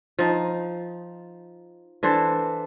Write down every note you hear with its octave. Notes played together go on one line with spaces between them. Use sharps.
F3 D#4
E3 D4 A4 C5